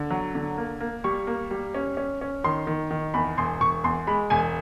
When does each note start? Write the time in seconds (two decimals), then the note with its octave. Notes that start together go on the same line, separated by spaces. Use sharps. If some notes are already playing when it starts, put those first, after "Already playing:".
Already playing: D3
0.11 F#3
0.35 D3
0.58 A#3
0.80 A#3
1.04 G3 C#6
1.27 A#3
1.51 G3
1.75 C#4
1.97 C#4
2.21 C#4
2.44 D#3 C6
2.67 D#3
2.91 D#3
3.14 E2 B5
3.38 E1 C6
3.60 E1 C#6
3.84 E2 C6
4.07 G#3 B5
4.30 E1 G#5